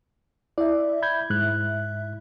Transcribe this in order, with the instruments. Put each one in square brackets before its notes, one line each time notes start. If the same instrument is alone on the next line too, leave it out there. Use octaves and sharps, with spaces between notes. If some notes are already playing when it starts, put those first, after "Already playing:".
[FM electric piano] E4 E5 [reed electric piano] D5
[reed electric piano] B5 G6 G#6
G#2 F#6